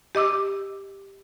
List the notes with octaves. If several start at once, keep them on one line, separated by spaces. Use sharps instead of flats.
G4 D#5 D6 E6